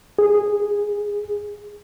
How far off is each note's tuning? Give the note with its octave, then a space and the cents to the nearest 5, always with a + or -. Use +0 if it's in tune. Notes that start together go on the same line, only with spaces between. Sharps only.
G#4 -10